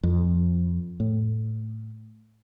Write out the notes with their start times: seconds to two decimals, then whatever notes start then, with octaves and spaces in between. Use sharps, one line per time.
0.03 F2
1.00 A2